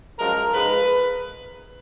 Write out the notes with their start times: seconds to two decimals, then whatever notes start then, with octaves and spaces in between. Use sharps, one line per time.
0.19 F#2 F3 G#3 A#4
0.54 G#2 F3 G#3 B4